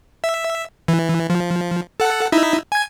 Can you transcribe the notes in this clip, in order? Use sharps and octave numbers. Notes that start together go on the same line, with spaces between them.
E5
E3
F3
A4 F#5
D#4 E4 E5
G#5 G#6